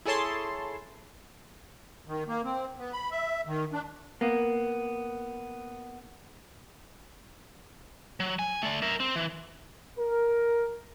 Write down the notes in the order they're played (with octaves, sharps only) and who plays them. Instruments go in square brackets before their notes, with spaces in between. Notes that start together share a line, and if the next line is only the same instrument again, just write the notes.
[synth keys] E4 G#4 A4 C#5 A5 C6
[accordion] D#3
A#3
C4
B3
B5
E5
D#3
D4
[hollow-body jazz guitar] A#3 B3
[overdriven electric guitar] F#3
G#5
A3 D5
A#4 E5
C4
E3
[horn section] A#4